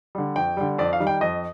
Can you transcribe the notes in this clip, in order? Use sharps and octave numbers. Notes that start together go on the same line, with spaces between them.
D3 G3
F2 G5
D3 G3
F2 D5
F5
D#3 G3
G5
F2 D#5